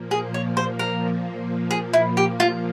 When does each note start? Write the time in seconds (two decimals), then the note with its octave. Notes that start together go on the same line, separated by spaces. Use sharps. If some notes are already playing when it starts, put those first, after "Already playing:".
Already playing: A#2 F3 A#3
0.11 G#4
0.34 C#5
0.57 C5
0.79 A#4
1.71 G#4
1.93 E4
2.17 G4
2.40 F4